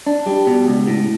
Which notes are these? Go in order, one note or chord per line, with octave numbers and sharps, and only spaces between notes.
D4
G3
B2
C#2
A2